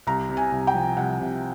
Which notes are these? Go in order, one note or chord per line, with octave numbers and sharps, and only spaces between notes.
C2 A#5
C3
G#5
C2
G5
F3
C2 F#5
C3